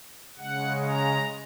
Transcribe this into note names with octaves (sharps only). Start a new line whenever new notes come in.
C#3 G#3 F#5
A#5